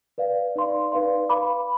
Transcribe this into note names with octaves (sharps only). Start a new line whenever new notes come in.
B4 D5 F5
D#4 B4 D5 F5 C6
D#4 B4 D5 F5 C6
B4 F5 B5 D6